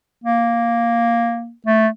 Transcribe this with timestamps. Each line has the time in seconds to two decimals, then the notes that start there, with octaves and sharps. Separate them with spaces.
0.24 A#3
1.67 A3